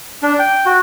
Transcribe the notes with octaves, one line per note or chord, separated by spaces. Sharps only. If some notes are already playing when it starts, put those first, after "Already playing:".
D4
G5
F#4